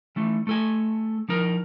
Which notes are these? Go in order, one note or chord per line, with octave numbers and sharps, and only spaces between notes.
E3 A3 D#4
A3 A4 G#5
F3 D#4 A#4